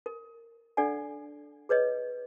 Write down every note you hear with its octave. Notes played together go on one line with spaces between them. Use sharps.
A#4
D4 A4 D5 F#5 G#5
G#4 B4 C#5 D#5